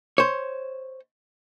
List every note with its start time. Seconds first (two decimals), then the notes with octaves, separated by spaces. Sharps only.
0.18 C5 C#5